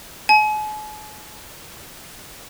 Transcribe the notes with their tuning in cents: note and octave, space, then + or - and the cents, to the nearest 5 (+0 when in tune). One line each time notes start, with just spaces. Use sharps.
G#5 +45